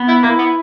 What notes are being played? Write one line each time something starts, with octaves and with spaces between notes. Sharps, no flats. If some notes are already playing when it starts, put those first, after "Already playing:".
Already playing: B3
E4
A#3 E4
B3